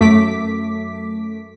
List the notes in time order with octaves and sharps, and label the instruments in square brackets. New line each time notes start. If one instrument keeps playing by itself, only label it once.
[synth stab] F#2 A3 D6 B6